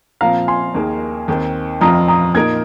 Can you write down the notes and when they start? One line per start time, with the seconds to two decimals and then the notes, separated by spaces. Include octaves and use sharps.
0.21 A#2 F3 C4 F5 A#5
0.48 G#5 C6
0.74 D#2 D#3 A#3 G#4
1.28 D#2 D#3 C4
1.81 F2 F3 C4 F4 A#5 D#6
2.08 A#5 D#6
2.34 A#2 A#3 D#4 A#4 D#6 G#6